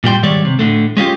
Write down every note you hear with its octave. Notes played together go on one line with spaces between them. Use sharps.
A#2 G3 G5 C6
G#2 D#3 G3 C#5 D5
C3
A2 D3 A3
G#3 C#4 F4 G4